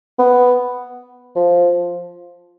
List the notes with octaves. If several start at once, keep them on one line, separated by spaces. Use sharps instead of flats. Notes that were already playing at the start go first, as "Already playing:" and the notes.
B3
F3